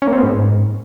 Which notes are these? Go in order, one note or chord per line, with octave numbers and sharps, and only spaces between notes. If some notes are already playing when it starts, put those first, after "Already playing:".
C#4
A#3
C4
B3
G#2